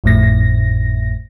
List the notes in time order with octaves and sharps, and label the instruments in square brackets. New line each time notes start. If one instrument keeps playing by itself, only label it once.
[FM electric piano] G#1 F2 A2 A#6